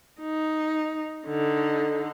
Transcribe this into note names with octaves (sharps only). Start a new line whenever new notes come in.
D#4
D3 D#4